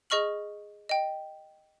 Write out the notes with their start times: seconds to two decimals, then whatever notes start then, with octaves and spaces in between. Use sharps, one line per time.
0.10 G#4 D#5 C#6 F6 F#7
0.89 D#5 G5